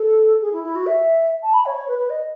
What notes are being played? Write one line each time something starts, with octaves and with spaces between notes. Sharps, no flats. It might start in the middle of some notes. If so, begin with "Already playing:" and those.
Already playing: A4
G#4
E4
E4
F#4
E5
A5
B5
C#5
C#5
B4
B4
D#5